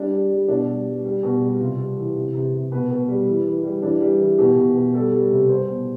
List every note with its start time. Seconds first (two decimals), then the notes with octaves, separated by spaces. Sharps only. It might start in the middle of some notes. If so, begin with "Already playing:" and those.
Already playing: G3 D4
0.11 G3
0.30 G3
0.48 B2 D4
0.68 G3
0.86 G3
1.04 G3
1.23 B2
1.42 G3
1.60 C3 F4
1.79 G3
1.97 E3
2.16 C3
2.34 C3
2.53 C3
2.72 B2 B4
2.91 B2
3.08 G3
3.27 E3
3.46 E3
3.64 G3
3.82 E3 D4
4.01 G3
4.20 E3
4.39 B2 G4
4.57 B2
4.76 B2
4.94 G3 A4
5.13 G3
5.31 C3
5.49 G3 C5
5.68 B2